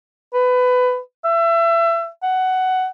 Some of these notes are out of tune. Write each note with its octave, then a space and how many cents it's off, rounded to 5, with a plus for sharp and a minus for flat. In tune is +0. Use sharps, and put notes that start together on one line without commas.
B4 +20
E5 +30
F#5 +15